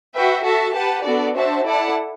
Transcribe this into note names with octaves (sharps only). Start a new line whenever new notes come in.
F#4 B4 E5 G5
F#4 A4 E5 A5
G4 B4 F#5 A5
B3 D4 F#4 A4 D5
D4 F#4 C5 E5 A5
E4 A4 D5 F#5 A5